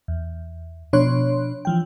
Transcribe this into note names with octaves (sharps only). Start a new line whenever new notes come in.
E2
B2 F3 D4 C#5 C6 F#6
E3 F3 G5